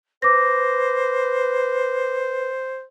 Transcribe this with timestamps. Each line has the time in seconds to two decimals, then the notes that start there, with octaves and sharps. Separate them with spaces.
0.22 B4 C5 D6 A#6